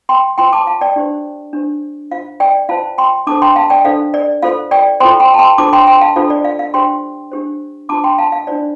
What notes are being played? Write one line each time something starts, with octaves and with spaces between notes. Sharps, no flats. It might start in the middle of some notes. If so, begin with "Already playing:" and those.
G5 C6
F4 C5 G5 C6
A5 D6
F5 A5
D5 G5
D4 G4 C5
D4 G4 C5
F4 C5 F5
D5 G5
F4 C5 F5 A5
G5 C6
D4 A4 C5 A5 D6
G5 C6
F5 A5
D5 G5
D4 A4 C5 F5
D5
F4 A4 C5 F5
D5 G5
F4 A4 C5 G5 C6
G5 C6
A5
G5 C6
D4 F4 A4 C5 A5 D6
G5 C6
G5 C6
F5 A5
D4 F4 A4 C5 F5
D5
F5
F5
D4 G4 C5 G5 C6
D4 G4 C5
D4 F4 C5 A5 D6
G5 C6
F5 A5
F5
D4 F4 C5 D5